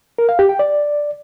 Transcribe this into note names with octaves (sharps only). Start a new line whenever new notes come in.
A#4
F5
G4
G5
D5